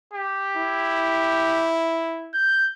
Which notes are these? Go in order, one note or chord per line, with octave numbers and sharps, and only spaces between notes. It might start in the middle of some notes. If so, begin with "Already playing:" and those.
G4
E4
G6